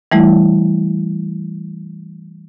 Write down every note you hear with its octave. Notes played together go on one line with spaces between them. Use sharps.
E3 G3 A3 E4